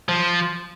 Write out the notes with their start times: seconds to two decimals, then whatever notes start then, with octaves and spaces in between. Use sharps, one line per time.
0.09 F3